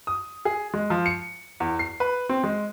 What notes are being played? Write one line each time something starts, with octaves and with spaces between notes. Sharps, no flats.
D#6
G#4
G#3
F3
C#7
E2
C7
B4
C4
G#3